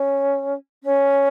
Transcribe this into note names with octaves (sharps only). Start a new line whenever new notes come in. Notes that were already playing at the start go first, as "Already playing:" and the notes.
Already playing: C#4
C#4